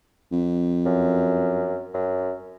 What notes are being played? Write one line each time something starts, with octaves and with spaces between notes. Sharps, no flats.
F2
F#2
F#2